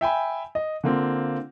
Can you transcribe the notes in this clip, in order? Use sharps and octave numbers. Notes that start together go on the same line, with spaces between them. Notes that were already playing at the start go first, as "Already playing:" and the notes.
E5 G5 G#5 B5
D#5
D3 A#3 C4 F4